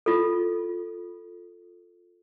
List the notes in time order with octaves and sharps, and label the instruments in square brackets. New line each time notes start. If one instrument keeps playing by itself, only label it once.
[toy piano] F4 A4